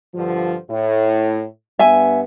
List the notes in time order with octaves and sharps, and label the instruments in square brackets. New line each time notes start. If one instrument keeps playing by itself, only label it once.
[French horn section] G2 D3 F3
A2
[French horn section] G2 B3 [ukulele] E5 G#5